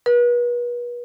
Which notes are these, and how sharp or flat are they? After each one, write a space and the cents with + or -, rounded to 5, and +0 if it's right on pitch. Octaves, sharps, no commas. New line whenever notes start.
B4 -40